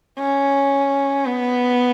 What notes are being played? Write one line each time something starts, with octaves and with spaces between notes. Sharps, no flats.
C#4
B3